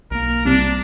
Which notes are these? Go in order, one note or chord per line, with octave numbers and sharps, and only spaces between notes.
B1 A#3 A#4
C2 C3 D4